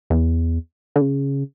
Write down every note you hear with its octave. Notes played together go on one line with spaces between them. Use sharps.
E2
D3
C#3